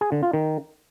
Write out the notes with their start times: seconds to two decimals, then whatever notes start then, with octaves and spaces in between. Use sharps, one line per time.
0.01 G#4
0.12 D3
0.23 F4
0.33 D#3